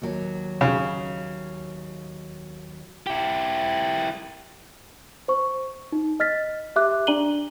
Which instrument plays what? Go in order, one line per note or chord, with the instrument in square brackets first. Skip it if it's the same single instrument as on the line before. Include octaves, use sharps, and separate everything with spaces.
[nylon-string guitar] D#2 F#3
[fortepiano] C#3
[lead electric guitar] E4 G4
[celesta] C5 C#6
D#4
D#5 F6 A6 B6
G4 E5 D6 F#6
D4 D5 A#5 D#7 F#7 G7